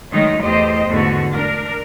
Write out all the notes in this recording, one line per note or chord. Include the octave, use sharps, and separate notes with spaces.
D#3 F#3 G#3 A3 D#4
E2 A3 G4 C5 D#5
E2 G#2 D3 A3 F#4
D4 A#4